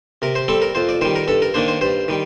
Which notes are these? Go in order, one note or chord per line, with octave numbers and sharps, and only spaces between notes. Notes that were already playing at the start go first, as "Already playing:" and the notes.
C3 A#4
C5
G3 C4 A4
A#4
F2 C5
D5
D#3 G3 C5
A#4
G2 A4
A#4
D#3 A#3 D4 C5
C5
G2 C5
D#3 G3